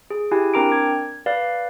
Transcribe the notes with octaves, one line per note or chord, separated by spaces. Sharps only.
G#4
E4 G4 G#5
C4 D4 A#4 A#5 D6 D7
G#6
B4 D5 F5